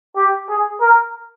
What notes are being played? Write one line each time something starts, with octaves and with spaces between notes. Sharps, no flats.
G4
G#4
A#4